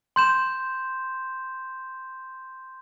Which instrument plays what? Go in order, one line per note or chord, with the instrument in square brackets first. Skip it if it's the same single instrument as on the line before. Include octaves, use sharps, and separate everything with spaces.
[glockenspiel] C6 G6 E7